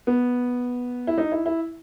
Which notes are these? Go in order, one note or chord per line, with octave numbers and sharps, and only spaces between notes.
B3
E4
D#4
E4
E4